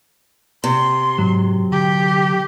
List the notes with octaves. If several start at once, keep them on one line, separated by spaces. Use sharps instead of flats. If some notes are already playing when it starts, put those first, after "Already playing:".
C3 C6
G#2 F#3
D3 G4